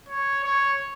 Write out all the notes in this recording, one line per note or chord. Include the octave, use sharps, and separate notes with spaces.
C#5
C#5